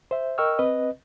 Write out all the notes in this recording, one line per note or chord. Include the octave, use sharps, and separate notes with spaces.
C5 E5
A#4 D#5 G5 C#6 E6 F6
C4 B4 D#5